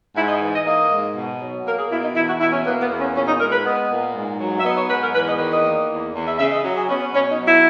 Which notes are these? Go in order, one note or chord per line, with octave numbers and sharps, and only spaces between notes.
G#2 E4
D#5
E3
D#5
A#3 D#5
G#2
B2
F#3
A#3 A#4
G#4
B2 E4
D#4
E2 E4
F#4
B2 E4
C#4
A#3 B3
B3
E2
C#4
A#2 C#4
D#4
G#3 A#4
B4
B3 D#5
A#2
G#2
F#3
E5
B3 D#5
C#5
G#2 B4
A#4
E2 B4
D#5
D#3 B4
D#5
A#3
E2
E2
E5
C#3 E5
D#5
F#3
G#4
B3 C#4
C#4
B2 C#4
D#4
F#3
E4